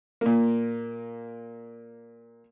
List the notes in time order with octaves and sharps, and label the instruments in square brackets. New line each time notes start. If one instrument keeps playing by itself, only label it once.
[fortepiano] A#2 A#3